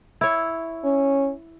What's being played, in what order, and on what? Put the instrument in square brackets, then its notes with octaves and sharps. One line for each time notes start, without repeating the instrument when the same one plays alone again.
[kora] E4 C#5
[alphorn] C#4